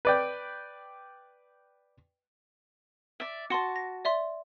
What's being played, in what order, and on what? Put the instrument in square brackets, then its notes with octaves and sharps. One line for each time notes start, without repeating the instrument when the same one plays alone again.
[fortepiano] B4 D5 G5
[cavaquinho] D5 E5
[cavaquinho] F#4 A5 [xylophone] C6 C#7
[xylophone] A#6
D5 E5 C6